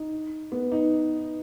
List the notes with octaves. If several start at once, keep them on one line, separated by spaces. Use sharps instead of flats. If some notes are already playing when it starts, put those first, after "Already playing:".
Already playing: D#4
B3
D#4